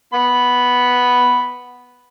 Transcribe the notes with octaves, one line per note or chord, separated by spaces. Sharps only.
B3 B5